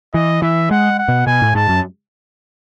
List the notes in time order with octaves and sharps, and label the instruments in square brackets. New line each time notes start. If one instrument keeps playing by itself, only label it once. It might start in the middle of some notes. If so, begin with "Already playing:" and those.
[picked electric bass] E3 [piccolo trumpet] D#5
[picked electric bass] E3 [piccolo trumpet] E5
[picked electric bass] G#3 [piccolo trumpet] F#5
[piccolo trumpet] F#5
[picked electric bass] B2
[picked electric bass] B2 [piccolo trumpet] G#5
[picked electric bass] A2
[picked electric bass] G#2 [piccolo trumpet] A5
[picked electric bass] F#2